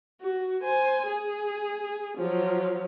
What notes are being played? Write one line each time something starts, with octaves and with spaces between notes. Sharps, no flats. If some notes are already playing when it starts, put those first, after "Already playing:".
F#4
C5 G#5
G#4
F3 F#3